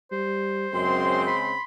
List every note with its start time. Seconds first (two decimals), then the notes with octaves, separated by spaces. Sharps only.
0.12 G3 C5
0.74 F#2 C#3 G#3 C4 C6
1.27 B5